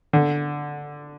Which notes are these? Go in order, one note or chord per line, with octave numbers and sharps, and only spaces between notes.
D3